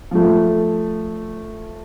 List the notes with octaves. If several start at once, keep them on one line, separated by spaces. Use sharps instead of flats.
F3 A3